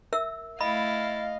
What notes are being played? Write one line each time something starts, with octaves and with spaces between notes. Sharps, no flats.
A#4 E5 E6
A3 E4 D#5 F5 B5 A6